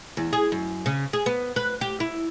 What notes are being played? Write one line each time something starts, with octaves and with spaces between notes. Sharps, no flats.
E2
G#4
F#2
C#3
G#4
B3
B4
G4
E4